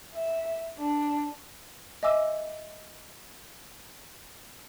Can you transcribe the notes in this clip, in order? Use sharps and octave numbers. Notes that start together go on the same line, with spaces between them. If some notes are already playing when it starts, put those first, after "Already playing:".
E5
D4
D#5 E5 G#5 D6 E6